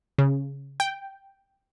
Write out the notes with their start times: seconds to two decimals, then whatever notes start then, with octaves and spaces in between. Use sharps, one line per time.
0.18 C#3
0.80 G5